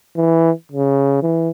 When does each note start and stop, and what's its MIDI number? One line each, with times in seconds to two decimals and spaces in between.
0.17 0.51 52
0.72 1.22 49
1.22 1.50 52